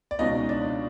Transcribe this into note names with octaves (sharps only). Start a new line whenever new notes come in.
D5
C#2 B2 G#3 C#4 D#4 D#5
D4 D5